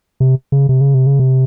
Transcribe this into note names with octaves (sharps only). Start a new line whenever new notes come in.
C3
C#3
C3
C#3
C3
C#3
C3